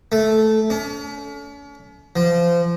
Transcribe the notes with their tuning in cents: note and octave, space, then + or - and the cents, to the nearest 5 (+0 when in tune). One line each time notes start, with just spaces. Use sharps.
A3 -10
C#4 +40
F3 -25